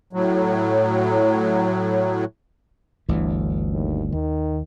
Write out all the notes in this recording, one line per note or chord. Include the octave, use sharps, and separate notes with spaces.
A2 F#3
G1 D2 E3
D#2
D#2 D#3